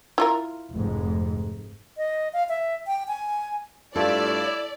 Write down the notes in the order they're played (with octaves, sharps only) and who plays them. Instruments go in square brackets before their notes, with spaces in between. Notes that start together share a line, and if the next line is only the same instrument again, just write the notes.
[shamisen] E4 F4 A#4
[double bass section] F1 G#2
[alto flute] D#5
F5
E5
G5
G#5
[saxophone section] G2 A3 F4 [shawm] E4 [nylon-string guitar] A4 [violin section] D5